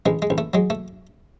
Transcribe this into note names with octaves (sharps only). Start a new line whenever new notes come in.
A1 G#3
G#3
A1
A3
F#3 G#3
A3